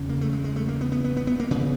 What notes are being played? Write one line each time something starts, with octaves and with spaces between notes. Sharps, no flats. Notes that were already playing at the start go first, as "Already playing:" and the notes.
Already playing: E2 C#3
A#3
A3
G#3
G#3
A3
A#3
B3
B3
B3
B3
B3
A#3
C#3 B3